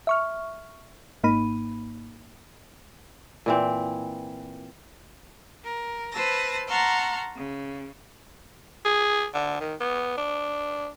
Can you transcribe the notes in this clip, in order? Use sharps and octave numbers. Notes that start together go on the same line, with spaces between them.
E5 C#6 F6
G#1 G#2 A#3 D#4 B5 D#7
A#2 E3 C4
A#4
B4 C5 A5 E6 A#6
F#5 A5 A#5 C6 C#6 F6
C#3
G#4
D3
D#3
B3
D4